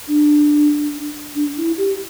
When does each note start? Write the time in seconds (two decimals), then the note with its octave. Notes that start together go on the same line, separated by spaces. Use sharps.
0.08 D4
1.35 D4
1.57 E4
1.78 G4